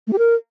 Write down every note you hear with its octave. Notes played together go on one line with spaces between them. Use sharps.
A3
G4
A#4